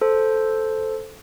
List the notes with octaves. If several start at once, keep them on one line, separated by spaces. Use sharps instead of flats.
A4 C5